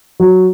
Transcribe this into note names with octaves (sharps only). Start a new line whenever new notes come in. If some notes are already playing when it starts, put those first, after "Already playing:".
F#3